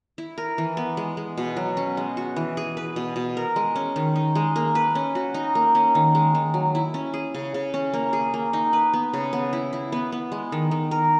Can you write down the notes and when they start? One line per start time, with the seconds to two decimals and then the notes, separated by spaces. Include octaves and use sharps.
0.18 E4
0.38 A#4
0.58 E3
0.77 B3
0.97 G#3
1.17 G#3
1.37 B2
1.57 F#3
1.77 C#4
1.97 G#3
2.17 F#4
2.36 E3
2.57 G#4
2.77 B4
2.96 B2
3.16 B2
3.37 A#4
3.56 G#3
3.76 C#4
3.96 D#3
4.16 D#4
4.35 G#3
4.56 A#3
4.75 B4
4.95 C#4
5.15 F#4
5.34 D#4
5.55 A#3
5.75 C#4
5.95 D#3
6.15 G#3
6.35 D#3
6.54 F#3
6.75 E4
6.94 C#4
7.14 G#4
7.34 C#3
7.54 C#3
7.74 C#4
7.93 A#3
8.13 G#4
8.34 A#3
8.53 D#4
8.73 B4
8.93 B3
9.13 C#3
9.33 B3
9.53 E4
9.73 E4
9.92 B3
10.12 B3
10.32 G#3
10.52 D#3
10.71 D#3
10.91 A#4